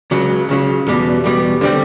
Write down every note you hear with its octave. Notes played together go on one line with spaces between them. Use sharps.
C#2 C#3 F#3
C#2 C#3 F#3
E2 B2 G3
E2 B2 G3
D3 G3 C4